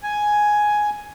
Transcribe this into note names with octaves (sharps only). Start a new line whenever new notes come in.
G#5